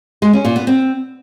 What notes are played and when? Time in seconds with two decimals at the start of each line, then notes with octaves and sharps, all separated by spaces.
0.22 G#3
0.33 C#4
0.45 A#2
0.56 B3
0.67 C4